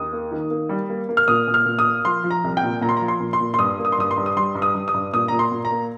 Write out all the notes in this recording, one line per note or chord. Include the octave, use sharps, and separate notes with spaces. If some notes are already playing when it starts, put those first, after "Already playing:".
Already playing: D#2 D#6
A#3
D#3
A#3
G3
A#3
A#3
F6
A#2 D#6
A#2
F6
A#2
D#6
A#3
F3 C6
F3
A#5
C2
G5
A#2
A#2 A#5
C6
A#5
F3
C6
A#2
C6
A#2
C6
G2 D#6
A#3
D#6
C6
G2 D#6
C6
G2
D#6
G3 C6
G2
D#6
G2
D#6
G2
A#2 D#6
A#2 A#5
C6
A#2
A#5
A#3